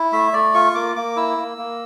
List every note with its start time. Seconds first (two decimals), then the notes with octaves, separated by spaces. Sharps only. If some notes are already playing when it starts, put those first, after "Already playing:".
Already playing: E4
0.12 A3 E5
0.33 A3 D5
0.54 F4 C#6
0.75 A#3 D6
0.96 A#3 D6
1.16 E4 E6
1.38 A#3
1.58 A#3